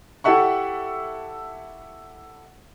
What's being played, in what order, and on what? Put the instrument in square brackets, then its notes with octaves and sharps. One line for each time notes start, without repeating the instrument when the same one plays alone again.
[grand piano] E4 G4 A4 E5 F#5 C#6